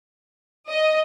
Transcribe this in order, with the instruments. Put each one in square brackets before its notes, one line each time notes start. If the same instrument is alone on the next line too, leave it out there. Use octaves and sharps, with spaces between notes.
[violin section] D#5